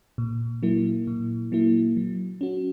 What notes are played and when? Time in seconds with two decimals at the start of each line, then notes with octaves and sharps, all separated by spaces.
0.18 A#2
0.63 F#3 A#3 E4
1.07 A#2
1.52 F#3 A#3 E4
1.96 F#3
2.41 C#4 F#4